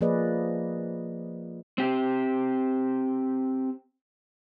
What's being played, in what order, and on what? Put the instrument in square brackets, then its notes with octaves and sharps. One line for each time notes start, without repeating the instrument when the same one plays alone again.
[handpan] F3 A#3 G#4 B4 D5 D#5
[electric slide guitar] C4 G4